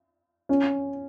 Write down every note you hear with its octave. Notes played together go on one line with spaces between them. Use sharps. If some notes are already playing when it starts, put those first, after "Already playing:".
C#4